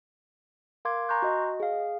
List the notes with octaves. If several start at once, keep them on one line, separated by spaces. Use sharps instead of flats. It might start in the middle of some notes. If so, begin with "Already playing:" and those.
A#4 F5 C6 D6 G#6
G#5 A#5 C6 C#6 F#6 G6
F#4 D#5
D#5
G#4 F5